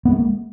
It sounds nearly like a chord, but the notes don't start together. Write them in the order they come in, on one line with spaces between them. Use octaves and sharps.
B3 G#3 A#3